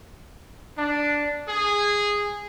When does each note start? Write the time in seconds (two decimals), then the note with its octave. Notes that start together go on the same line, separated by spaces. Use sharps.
0.77 D4
1.48 G#4